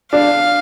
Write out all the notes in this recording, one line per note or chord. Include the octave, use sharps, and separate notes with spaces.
D4 F5